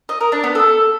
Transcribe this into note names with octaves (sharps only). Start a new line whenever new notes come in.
D#5
A#4
D4
B3
A4